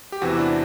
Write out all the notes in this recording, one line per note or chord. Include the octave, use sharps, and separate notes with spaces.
G4
E2 C3 E3 F#4
E4
D4